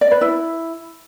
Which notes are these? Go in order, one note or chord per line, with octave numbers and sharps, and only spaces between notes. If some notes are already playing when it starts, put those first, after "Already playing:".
D5
B4
E4